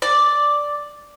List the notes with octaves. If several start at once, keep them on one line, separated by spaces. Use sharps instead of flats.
D5